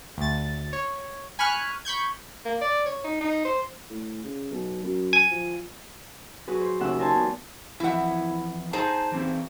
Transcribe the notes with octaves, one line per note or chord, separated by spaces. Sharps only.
D2 A6
C#5
G#5 B5 C#6 F6 F#6
B5 C#6 G6 G#6
A#3
D5
C#5
D#4
D#4
C5
A2
C#3
B1
F#2
G#5
F3
F#3 F#4 G#4 B4
C5
D#2 C#3 E5 F#5 E6
D#4 A#4 C5 G#5 A5 C6
E2
F2 E3 E4 F#5
D#4 G#4 C5 G#5 A5
E3 C4